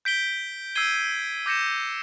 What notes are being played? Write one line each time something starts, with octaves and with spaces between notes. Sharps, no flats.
G6 B6 D7 G7
E6 G#6 C7 D#7 G7
D6 G6 A#6 C#7 E7